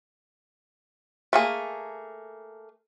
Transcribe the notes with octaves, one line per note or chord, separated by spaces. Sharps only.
A3 A#3 G#4